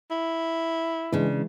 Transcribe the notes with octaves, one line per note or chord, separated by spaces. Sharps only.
E4
C#3 E3 G#3 D4